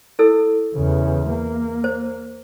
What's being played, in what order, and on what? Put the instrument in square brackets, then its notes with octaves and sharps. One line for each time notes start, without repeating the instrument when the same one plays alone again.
[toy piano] E4 A4 E6
[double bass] E2 C#3
A#3
[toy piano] C5